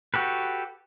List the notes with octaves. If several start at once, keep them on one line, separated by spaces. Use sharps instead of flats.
F#4 G4 A4 B4